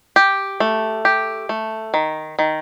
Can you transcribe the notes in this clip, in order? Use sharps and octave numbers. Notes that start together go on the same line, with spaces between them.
G4
A3
G4
A3
D#3
D#3